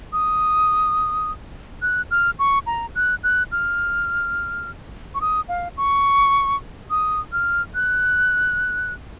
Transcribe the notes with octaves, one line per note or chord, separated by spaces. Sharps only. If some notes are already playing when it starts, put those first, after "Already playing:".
D#6
F#6
F6
C#6
A#5
F#6
F#6
F6
C#6
D#6
F5
C#6
D#6
F6
F#6